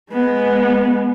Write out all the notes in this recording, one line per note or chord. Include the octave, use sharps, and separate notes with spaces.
G#3 B3